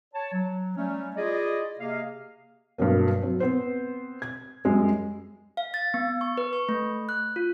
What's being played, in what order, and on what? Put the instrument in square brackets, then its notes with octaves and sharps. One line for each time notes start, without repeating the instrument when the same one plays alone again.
[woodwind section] C#5 A5
F#3
F#3 G3 A3 C#4
E4 F4 G#4 D5 D#5
C3 A#3 G#4 D#5 F5
[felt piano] G2 B2 F#3 A#3
F#3 C4
B3 C4 B4 C5
G#6
F#2 G3 G#3
[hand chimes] F5
A6
B3
C#6
B4
C#6
A3
F#6
F4